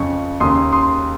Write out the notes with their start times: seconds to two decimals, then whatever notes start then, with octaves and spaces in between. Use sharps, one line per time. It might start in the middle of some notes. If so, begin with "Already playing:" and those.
Already playing: F2 C#3 C#6
0.40 D#2 C#3 C6 D#6
0.72 C6 D#6